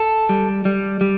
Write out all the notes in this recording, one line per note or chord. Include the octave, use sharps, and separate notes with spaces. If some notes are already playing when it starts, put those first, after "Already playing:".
Already playing: A4
G3
G3
G3